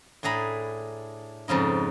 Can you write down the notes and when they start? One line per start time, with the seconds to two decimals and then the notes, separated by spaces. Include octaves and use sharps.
0.23 A2 D4 G#4 A#5 B5
1.48 F2 G#2 C#3 D#4